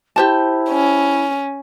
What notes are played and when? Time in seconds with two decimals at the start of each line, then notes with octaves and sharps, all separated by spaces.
0.16 E4 G4 C5 A5
0.70 C#4